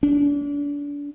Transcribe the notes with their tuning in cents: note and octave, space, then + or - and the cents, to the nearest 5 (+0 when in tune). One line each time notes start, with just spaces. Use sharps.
D4 -35